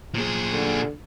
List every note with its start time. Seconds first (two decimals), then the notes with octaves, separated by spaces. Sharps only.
0.15 A#2 G#4
0.52 D3